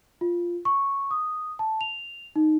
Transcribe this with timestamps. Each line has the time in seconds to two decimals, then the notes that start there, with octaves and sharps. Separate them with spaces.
0.21 F4
0.65 C#6
1.11 D#6
1.59 A5
1.81 F7
2.36 D#4